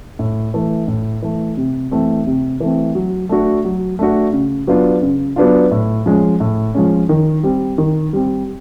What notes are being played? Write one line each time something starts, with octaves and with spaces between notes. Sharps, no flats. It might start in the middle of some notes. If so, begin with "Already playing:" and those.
A2
E3 A3
A2
E3 A3
C3
E3 A3 C4
C3
E3 A3 C4
F#3
A3 D4 F#4
F#3
A3 D4 F#4
C#3
F#3 B3 D4 F4
C#3
F#3 B3 D4 F4
A2
F3 G#3 C#4
A2
F3 G#3 C#4
D#3
G3 C4
D#3
G3 C4